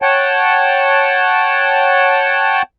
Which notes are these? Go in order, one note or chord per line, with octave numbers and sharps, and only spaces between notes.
C#5 F#5 G5 A5